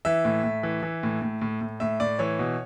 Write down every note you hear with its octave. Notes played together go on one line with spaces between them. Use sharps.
E3 E5
A2
A2
E3
E3
A2
A2
A2
A2
A2 E5
A2 D5
E3 C#5
B2